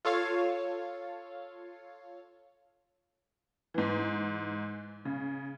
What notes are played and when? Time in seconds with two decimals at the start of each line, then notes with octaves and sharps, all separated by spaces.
0.05 F4 A4 C#5 F5
3.74 G#2 E3
5.05 C#3